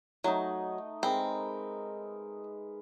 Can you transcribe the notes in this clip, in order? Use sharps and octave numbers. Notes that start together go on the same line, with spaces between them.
F#3 A3 D#4
G#3 C4 A#4 B4